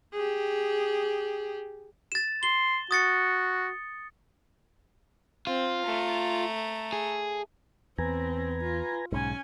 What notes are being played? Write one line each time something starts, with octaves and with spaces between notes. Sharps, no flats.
G4 G#4
A6 E7
C6 G7
F#4 D#6 A6 C#7
C4 F4
A3 A#5
G#4
E2 C4 B4 G#5 A#5
F4
B1 G#2 C#4 G#5